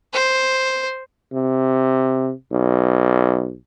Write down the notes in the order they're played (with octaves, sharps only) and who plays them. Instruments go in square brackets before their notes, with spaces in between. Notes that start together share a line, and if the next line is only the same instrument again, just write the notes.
[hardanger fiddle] C5
[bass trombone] C3
B1